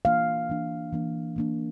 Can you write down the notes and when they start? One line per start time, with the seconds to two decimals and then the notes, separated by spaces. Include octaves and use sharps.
0.05 E3 A#3 D4 F5
0.49 E3 A#3 D4
0.93 E3 A#3 D4
1.36 E3 A#3 D4